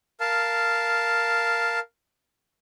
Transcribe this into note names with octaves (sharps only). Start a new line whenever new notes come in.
A#4 F5 A5